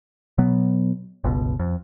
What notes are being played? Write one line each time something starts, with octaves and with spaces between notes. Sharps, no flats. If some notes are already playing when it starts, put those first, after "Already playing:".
B2 F#3 B3
G1 C#2 B2
F2